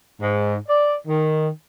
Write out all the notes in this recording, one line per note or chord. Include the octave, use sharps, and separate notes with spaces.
G#2
D5
D#3